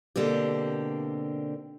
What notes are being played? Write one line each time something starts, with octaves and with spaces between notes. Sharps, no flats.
B2 D3 A#3 C4 G4